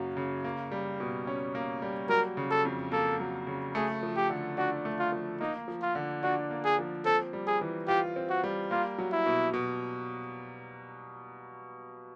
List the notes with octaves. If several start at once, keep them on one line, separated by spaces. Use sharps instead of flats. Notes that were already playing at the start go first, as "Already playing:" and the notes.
Already playing: F#2 C#3 F#3 A#3
C#3
A#3
G3
B2
C#4
A#3
G3
F#3 A#4
C#3
A4
F2
A#3 A4
F#3
C#3
A3 G#4
F3
G4
D3
D4 F#4
A3
F4
F3
A#3 D#4
F3
F4
D3
D4 F#4
A#3
G#4
F3
C4 A4
G3
G#4
E3
F4 G4
C4
F#4
G3
A#3 F4
F#3
E4
B2
B2